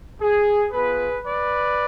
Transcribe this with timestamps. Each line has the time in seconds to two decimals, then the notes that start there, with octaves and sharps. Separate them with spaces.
0.21 G#4
0.72 B3 F4 G#4 B4
1.23 B4 D5